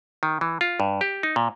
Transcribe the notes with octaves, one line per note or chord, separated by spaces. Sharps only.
D#3
E3
F4
G2
G4
D#4
A#2